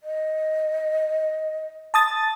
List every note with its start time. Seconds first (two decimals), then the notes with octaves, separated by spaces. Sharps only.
0.03 D#5
1.94 A5 D#6 A6